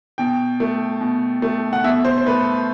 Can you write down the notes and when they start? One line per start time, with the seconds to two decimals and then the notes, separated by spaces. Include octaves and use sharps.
0.18 B2 G5
0.60 A3
1.01 B2
1.42 A3
1.73 F#5
1.84 B2 E5
2.05 C5
2.18 C5
2.26 A3 B4